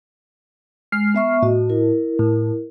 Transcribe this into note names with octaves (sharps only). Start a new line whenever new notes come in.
G#3 F6 C7
B3 E5 C#6
A2 F#4 D#5
E4 A#4
A2